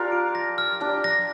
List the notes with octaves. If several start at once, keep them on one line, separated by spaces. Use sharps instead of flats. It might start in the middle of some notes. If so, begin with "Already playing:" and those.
Already playing: D4 F4 G4 A#4
D7
A#6
F6
D4 G4 F6
A#6